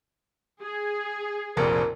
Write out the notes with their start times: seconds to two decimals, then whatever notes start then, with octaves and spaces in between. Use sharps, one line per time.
0.62 G#4
1.57 F1 A#1 F2 A#4